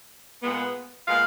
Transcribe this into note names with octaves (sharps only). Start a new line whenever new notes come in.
A#2 G#3 B3
A#2 G#3 B3 F5